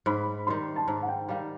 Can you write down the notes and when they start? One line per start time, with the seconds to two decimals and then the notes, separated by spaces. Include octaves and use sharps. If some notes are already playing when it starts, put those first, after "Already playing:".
0.06 G#2 B5
0.47 D#3 G3 C6
0.76 A5
0.87 G#2 A#5
1.02 F#5
1.08 G5
1.29 D#3 G3 F5